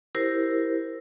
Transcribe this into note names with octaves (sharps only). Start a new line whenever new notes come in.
E4 G4 A#4 C5